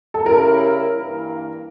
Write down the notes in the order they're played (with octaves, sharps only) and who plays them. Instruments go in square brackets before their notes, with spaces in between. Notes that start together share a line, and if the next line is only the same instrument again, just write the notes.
[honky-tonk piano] A4
[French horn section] C#3 G3 C#4 E4 [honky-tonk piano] A#4
[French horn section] G2 E3 A#3 E4